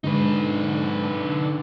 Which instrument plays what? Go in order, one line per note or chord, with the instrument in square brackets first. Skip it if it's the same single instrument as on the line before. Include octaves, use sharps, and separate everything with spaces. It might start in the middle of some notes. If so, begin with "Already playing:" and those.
[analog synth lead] G#2 [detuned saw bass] D3 [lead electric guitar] D#4 B4